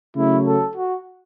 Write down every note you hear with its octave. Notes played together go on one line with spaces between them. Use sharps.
C#3 F#3 A3 E4
A4
F#4